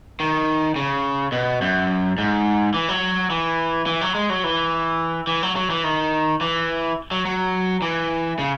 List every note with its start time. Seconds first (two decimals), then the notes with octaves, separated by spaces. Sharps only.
0.20 D#3
0.76 C#3
1.32 B2
1.62 F#2
2.18 G#2
2.74 E3
2.89 F#3
3.30 E3
3.86 E3
4.01 F#3
4.15 G#3
4.30 F#3
4.44 E3
5.27 E3
5.43 F#3
5.56 F#3
5.70 E3
5.84 D#3
6.41 E3
7.11 F#3
7.25 F#3
7.82 E3
8.39 C#3